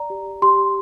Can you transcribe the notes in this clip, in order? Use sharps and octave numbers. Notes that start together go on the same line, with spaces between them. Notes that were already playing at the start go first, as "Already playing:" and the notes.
Already playing: D5 A#5
G4
G4 C6